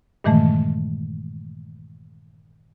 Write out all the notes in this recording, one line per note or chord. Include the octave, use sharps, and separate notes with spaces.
G2 A#2 D#3 E3 G#3 A3